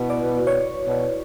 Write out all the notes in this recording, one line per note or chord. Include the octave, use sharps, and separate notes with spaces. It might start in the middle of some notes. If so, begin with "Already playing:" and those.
Already playing: B2 E4 F#4 B4
D5
C#5
B2